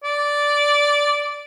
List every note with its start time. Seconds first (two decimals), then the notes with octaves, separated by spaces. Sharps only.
0.04 D5